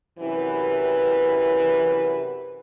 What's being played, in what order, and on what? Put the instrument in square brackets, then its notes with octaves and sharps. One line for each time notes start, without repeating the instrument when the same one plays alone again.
[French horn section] F#2 C3 E3 E4 B4